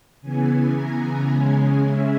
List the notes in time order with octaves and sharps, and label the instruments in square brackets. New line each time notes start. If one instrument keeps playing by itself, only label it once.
[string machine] C#3 E3 B3 G#5
A#5
C#3 G#3 C#4 G#5
E5